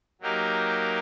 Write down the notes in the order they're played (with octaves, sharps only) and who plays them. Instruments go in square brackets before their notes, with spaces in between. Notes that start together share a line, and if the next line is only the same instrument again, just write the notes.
[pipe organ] F#3 A#3 D#4 G4 A#4